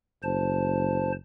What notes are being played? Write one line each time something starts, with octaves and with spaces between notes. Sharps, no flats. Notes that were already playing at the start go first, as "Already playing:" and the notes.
F#1 C5 A5